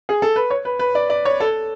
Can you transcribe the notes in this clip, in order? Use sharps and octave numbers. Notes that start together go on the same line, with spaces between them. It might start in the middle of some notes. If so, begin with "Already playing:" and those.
G#4
A4
B4
C#5
B4
B4
D5
D5
C#5
A4